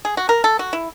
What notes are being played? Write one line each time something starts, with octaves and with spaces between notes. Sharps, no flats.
G#4
F#4
A#4
A4
F#4
E4